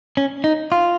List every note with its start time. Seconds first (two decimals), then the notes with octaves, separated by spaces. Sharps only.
0.17 C#4
0.44 D#4
0.72 F4